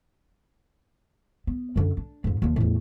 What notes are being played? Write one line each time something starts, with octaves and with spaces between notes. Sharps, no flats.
B3
F#2 D3
D4
F2 G#2
D#2 F3
E2 A2